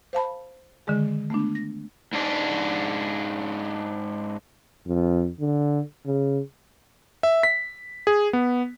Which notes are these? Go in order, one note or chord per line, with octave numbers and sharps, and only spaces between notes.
C5 F5 A5 B5
D3 D#3 G#3 G#4
A3 B3 D4
A#6
G#2 D4
F2
D3
C#3
E5
B6
G#4
B3